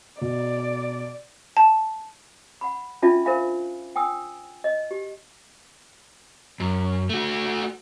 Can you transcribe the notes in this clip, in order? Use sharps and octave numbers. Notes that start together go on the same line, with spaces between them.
B2 D5
A5
F#5 B5
C#4 D4 F4 E5 A5
A#4 C5 E5 F5 G#5 B5
G5 G#5 D#6 E6
D#5
G4
F#2
A3 F#4